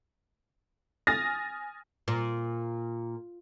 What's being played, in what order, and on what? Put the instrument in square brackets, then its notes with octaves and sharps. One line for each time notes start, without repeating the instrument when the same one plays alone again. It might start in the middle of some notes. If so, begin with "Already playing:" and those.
[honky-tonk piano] G#5 D#6 F6 A6 A#6
[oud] A#2